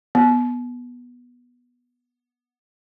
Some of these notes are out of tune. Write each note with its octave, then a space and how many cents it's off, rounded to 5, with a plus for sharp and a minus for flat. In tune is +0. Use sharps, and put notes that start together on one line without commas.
B3 -10